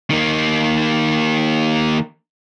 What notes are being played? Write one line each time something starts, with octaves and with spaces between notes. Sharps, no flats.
D#3 A#3